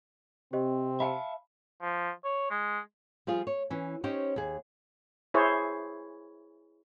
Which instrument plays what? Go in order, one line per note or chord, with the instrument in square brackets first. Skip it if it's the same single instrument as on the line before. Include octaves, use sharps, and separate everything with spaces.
[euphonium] C3 [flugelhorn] C4 [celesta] G4 C5 D#5
[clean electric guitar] E5 F5 A5 [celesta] B5
[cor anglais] F3
C#5
G#3
[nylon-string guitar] F3 G3 F4 G#4
C#5
E3 C#4
C#4 D#4 G4 C5 C#5
D#2 G#4
[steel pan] E4 G#4 C5 C#5